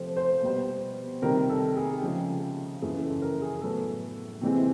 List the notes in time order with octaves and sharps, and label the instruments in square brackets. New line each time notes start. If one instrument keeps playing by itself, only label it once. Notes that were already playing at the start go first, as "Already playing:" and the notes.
Already playing: [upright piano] C3 F3 A3 C4 C5
C5
B2 G3 B3
C3 D#3 G3 A#4
A4
G#4
C#3 F3 G#3
F#2 C#3 E3 G#4
A4
A#4
G#4
A2 F#3 B3 A4
C3 E3 G#3 C4